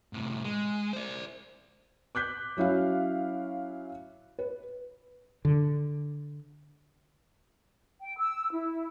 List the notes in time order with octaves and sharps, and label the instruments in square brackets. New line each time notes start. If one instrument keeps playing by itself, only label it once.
[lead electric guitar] A2 C3
G#3
C5 D5
[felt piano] D6 F#6 G6 B6
F#3 C#4 E4 F#4 F5
B4
[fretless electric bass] D3
[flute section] G5
E6
E4